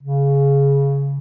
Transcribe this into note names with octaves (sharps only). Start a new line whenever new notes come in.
C#3